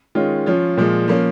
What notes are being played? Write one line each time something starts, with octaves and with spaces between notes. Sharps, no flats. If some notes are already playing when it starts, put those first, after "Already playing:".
D#3 G#3 C#4 F4
F3 C#4 F4
A#2 F3 G#3
F3 A#3 C#4